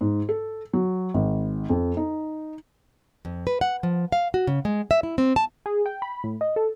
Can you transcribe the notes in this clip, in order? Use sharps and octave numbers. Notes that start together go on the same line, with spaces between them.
G#2
A4
F#3
G#1
F2
D#4
F2
B4
F#5
F3
F5
F#4
C#3
G#3
E5
E4
C4
A5
G#4
G5
B5
A2
D#5
A4